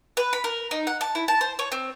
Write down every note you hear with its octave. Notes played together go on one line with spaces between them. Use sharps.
B4
B5
A#4
D#4
F#5
A5
E4
A5
C5
C#5
C4